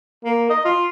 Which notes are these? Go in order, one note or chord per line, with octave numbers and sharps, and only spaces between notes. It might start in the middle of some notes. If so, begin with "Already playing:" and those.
A#3
D#5
F4